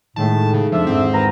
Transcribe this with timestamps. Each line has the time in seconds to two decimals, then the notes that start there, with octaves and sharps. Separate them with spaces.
0.16 A2 D#3 G#3 A3 A5
0.54 C#3
0.72 F2 F3 D4 E5
0.87 E2 G#2 C4
1.14 G#1 A#4 B4 A#5 D#7